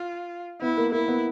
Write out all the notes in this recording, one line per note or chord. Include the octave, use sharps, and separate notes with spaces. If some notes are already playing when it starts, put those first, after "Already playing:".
Already playing: F4
B3 E4
A#3
A#3 E4
B3